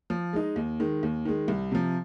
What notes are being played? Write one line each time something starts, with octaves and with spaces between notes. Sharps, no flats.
F3
G#3 D#4
D#2
D#3 G#3
D#2
D#3 G#3
C2
C3 F3